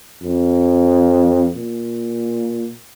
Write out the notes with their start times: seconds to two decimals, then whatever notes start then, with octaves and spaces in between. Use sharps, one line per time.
0.23 F2
1.55 A#2